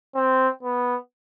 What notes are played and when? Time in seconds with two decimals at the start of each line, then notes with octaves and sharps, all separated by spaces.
0.15 C4
0.63 B3